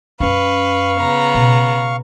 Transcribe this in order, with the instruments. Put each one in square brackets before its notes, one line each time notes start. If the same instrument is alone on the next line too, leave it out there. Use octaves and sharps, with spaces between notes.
[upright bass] F#2 C#4 [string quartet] B4 [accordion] F5 C#6
[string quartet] C#3 B3 A#5
[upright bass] B2